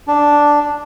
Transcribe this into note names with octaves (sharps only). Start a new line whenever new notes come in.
D4